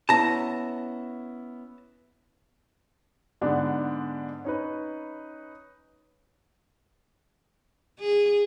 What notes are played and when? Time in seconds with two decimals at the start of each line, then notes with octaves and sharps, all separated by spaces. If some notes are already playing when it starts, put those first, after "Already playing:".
0.09 B3 C#4 E4 A5 A#5
3.41 G#2 D3 B3 D4
4.44 C#4 D#4 B4
8.00 G#4